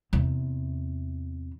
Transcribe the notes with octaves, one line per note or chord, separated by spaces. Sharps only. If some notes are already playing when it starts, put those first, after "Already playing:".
E2 C3